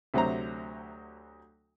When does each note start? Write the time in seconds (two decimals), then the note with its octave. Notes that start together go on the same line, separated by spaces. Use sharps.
0.14 D2 C3 F#3 C5 A#5